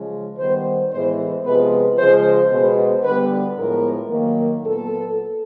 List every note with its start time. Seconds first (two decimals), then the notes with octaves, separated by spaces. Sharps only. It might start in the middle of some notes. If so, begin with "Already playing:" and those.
Already playing: C#3 F3 G#3
0.38 D#3 G3 B3 C5
0.91 A2 E3 G#3 B3 C5
1.44 C3 F3 G#3 B3 B4
1.98 C#3 F3 G#3 C5
2.51 B2 G#3 B3 C5
3.03 D3 G3 B3 B4
3.57 A2 F3 G#3 B3 A#4
4.10 D#3 F#3 A#3
4.63 A#2 F#3 B3 A4